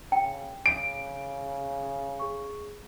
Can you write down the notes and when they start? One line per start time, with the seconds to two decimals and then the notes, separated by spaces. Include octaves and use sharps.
0.12 C#3 G5
0.66 C#3 D7
2.19 G#4 C#6